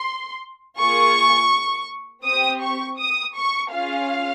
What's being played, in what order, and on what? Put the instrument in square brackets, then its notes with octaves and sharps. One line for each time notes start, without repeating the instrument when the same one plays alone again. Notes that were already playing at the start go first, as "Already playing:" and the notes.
Already playing: [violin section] C6
A#3 F4 G#4 C#6
C4 G4 D#6
C#6
D#6
C#6
C#4 F4 G#4 F5